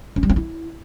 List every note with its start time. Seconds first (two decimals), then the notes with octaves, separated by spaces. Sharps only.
0.16 C#4
0.23 G3
0.30 C4
0.36 E4